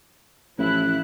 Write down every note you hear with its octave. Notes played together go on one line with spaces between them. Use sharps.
A1 F3 E4 F#6